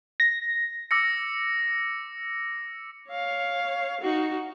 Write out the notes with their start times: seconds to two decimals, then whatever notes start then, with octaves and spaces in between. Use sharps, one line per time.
0.20 A#6
0.91 D6 E6 A#6 C#7
3.09 C#5 F5
4.01 D#4 F#4